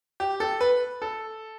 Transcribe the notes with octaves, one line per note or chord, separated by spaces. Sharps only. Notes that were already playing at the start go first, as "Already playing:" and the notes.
G4
A4
B4
A4